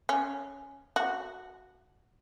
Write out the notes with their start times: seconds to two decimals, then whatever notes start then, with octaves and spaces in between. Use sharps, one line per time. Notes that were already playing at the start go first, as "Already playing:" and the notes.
0.09 C#4
0.96 F#4